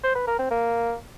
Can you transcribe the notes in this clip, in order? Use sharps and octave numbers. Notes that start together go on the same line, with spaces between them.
C5
B4
A#4
C4
A#3